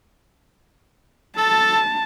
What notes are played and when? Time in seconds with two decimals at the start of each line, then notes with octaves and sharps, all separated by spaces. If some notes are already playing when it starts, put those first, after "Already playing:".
1.37 A4 A5